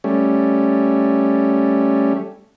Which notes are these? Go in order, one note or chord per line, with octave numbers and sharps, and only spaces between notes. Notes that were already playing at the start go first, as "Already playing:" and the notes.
G3 A3 C#4